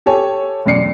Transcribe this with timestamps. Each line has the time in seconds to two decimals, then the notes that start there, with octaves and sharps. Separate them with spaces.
0.06 G4 A4 C#5 G#5
0.65 E1 F#2 D5 C7 C#7